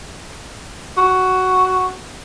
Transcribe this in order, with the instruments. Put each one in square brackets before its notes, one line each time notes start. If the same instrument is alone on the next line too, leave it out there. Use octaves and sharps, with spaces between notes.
[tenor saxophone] F#4